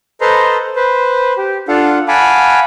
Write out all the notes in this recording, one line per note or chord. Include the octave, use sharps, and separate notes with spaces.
A4 B4 C5 D#5 A#5 C6
B4 C5
G4
D4 F4 A4 F5 F#5
F5 F#5 G#5 A5 B5 D6